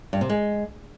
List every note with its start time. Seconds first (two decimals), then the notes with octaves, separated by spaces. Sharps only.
0.13 G2
0.21 C3
0.29 G#3